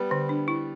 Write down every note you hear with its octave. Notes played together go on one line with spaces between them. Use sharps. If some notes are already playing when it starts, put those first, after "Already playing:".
Already playing: G3 B3
D3
D4
E4